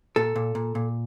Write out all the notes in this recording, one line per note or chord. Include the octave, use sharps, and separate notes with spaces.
A#2 A4
A#2
A#2
A#2